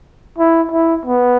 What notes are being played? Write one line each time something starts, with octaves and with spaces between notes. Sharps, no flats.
E4
E4
B3